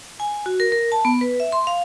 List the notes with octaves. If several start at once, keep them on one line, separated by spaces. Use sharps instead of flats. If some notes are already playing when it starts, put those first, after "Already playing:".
G#5
F#4
A#4
A#4
A5
B3
B4
E5
C6
F5